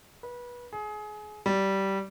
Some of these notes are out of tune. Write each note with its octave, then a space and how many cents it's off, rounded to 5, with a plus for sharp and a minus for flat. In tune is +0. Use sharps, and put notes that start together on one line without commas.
B4 -25
G#4 +25
G3 -15